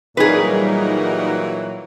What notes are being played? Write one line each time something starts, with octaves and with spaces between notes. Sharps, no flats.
A#2 E3 F#3 G3 D#4 G#4 A#4 B4